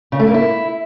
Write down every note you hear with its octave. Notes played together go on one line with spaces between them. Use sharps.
C#3
A3
A#3
E4